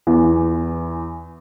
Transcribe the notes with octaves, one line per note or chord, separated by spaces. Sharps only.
E2 E3